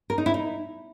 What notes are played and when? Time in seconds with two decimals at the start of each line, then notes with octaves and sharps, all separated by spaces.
0.10 A#4
0.18 D#4
0.26 E4
0.34 D#4